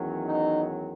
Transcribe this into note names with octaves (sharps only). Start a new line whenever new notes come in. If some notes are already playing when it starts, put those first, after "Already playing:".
Already playing: E2 D#3 F#3 C#4
D#4